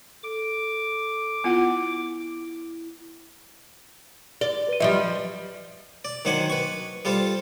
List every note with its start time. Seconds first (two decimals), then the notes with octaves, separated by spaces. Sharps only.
0.23 A4 D6
1.44 B3 E4 F4 F#5
4.41 D5 G7
4.68 B4 D#7
4.80 F#2 F3 G3 B4 D#5 E5
6.05 D5
6.25 D#3 F#3 D4 C5 F#5 G#5
6.50 B4 C#6
7.05 G3 F4 A4 C5